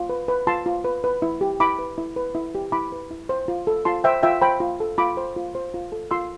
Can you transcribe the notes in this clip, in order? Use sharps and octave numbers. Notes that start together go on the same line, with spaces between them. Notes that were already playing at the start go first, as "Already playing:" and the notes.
Already playing: F4
B4
B4
F4 A5 C6
F4
B4
B4
E4
G4
E4 B5 D6
B4
E4
B4
E4
G4
E4 B5 D6
B4
E4
C5
F4
A4
F4 A5 C6
C5 E5 G5
F4 E5 G5
C5 G5 B5
F4
A4
F4 B5 D6
C5
F4
C5
F4
A4
F4 C6 E6